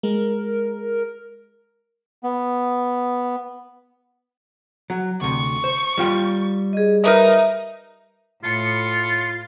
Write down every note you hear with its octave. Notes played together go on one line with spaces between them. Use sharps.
G#3 A#4
B3
F#3
D2 C3 C#6
C5
G3 F4 G5
G#4 D#5
D#4 A#4 B4 D#5 E5
A2 F4 C#7